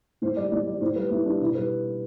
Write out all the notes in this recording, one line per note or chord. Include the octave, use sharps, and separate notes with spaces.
A2 C5
G3 D5
A2 D5
G3 D5
A2 C5
G3 B4
A2 E4
G3 D4
B2 E4
G3 B4